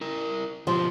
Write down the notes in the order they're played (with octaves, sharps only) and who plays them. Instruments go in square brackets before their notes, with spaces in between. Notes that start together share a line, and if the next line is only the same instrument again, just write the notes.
[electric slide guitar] E4 A#4
[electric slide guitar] B2 G4 [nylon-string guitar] F3